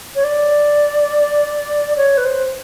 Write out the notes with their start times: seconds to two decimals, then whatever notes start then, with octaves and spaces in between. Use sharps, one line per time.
0.15 C#5
0.24 D5
1.96 C#5
2.17 B4
2.25 C5